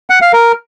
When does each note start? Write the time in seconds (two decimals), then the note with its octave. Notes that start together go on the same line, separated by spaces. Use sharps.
0.10 F#5
0.21 F5
0.33 A#4